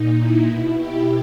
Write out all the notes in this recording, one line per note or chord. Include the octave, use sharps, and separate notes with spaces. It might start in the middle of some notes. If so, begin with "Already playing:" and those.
Already playing: A#2 D#4
E4
B2
G4